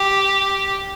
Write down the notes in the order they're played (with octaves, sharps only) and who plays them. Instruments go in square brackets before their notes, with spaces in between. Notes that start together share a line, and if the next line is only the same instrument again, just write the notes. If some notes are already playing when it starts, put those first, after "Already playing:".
Already playing: [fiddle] G4